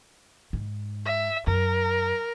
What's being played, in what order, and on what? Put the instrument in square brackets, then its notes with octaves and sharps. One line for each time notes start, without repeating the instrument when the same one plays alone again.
[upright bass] G#2
[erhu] E5
[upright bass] F#2 [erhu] A#4